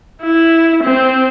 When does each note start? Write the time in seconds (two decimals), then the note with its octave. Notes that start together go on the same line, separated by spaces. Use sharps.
0.23 E4
0.83 C4